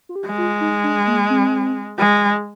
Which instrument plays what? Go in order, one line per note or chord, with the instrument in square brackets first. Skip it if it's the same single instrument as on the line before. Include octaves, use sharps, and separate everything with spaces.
[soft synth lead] F4
G4
[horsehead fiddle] G#3
[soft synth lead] F4
D#4
D4
A#3
C4
[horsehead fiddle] G#3